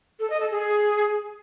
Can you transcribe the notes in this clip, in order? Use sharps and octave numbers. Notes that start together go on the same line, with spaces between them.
A4
D#5
A4
G#4